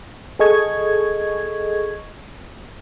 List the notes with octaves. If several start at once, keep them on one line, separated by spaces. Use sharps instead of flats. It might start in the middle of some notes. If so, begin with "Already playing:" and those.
G#4 A4 D#5 C#6 G#6